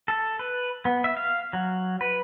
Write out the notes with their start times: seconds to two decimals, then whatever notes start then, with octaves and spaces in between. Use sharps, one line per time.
0.08 A4
0.39 B4
0.85 B3
1.04 E5
1.17 F5
1.53 F#3
2.01 B4